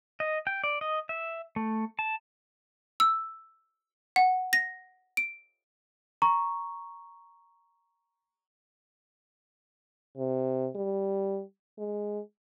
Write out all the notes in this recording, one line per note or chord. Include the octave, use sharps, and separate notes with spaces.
D#5
G5
D5
D#5
E5
A3
A5
E6
F#5
A#6
D7
A#5 C#6
C3
G3
G#3